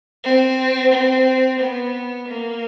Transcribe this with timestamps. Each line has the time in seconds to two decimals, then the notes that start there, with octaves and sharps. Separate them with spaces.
0.24 C4
0.92 C4
1.60 B3
2.27 A#3